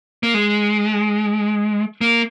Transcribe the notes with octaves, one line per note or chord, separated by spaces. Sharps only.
A#3
G#3
A#3